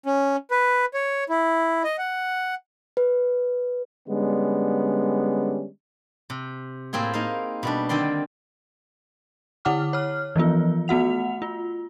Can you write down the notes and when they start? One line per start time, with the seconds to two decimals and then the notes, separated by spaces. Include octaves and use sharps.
0.06 C#4
0.51 B4
0.94 C#5
1.30 E4
1.84 D#5
1.98 F#5
2.97 B4
4.09 D3 G3 G#3 B3 C#4 D4
6.30 C3
6.93 A2 A#3 C4 E4 G#4
7.14 A#3 D#4 F5
7.63 B2 G3 D4
7.89 D3 D#3 C4 D5 C6
9.65 D3 E4 F#5 D6 F6
9.93 C#5 F6
10.36 E3 F3 B3 F4
10.88 A3 B3 F#4 F#5 F7
11.42 F4